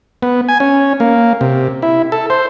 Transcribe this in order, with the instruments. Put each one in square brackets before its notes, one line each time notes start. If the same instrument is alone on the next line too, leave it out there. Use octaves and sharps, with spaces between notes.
[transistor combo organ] B3
G#5
C#4
A#3
C3
E4
A4
C5